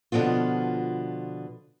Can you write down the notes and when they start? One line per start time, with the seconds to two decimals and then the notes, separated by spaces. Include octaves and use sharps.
0.12 B2 D3 F3 B3 F4